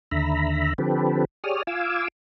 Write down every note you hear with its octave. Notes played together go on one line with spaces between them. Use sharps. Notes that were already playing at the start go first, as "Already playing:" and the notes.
D#2 D3 E5 A#5 B5
D3 F3 C4 G4 A4 B4
G4 G#4 C#5 D5 D#6 F6
F4 F5 G#5 D6 E6